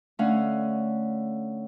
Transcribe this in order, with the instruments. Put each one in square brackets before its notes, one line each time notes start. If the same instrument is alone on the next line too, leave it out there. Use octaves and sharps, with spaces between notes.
[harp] D3 A3 C#4 F5 F#5